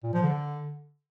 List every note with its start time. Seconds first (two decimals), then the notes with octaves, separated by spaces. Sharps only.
0.04 A#2
0.14 F3
0.23 D3